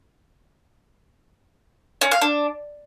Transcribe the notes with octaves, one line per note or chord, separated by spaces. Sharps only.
C#4
F5
D4